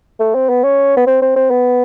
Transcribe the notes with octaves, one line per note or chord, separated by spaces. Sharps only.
A3
C4
B3
C#4
B3
C4
C4
C4
B3